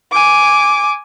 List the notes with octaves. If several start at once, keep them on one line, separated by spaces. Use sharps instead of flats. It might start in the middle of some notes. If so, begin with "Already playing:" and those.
G#5 D6